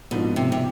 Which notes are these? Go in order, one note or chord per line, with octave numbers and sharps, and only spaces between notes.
A#1 G#2 B2 F3 A#3
C3
C3